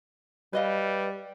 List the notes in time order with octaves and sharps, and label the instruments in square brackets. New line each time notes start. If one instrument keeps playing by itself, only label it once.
[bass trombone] G3 [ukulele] B4 D#5 F5